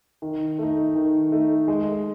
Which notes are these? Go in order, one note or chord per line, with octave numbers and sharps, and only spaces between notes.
D#3
A3 D#4
D#3
A3 D#4
G#3